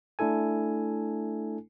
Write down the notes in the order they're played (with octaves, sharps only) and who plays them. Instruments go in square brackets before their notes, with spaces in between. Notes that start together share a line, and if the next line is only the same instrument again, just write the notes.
[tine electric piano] A3 D4 E4 A4 G#5